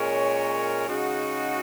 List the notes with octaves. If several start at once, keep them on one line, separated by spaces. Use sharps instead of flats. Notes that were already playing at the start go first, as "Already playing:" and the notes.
Already playing: A#2 G#3 C#4 A#4 C#5
C#3 G#3 D#4 F#4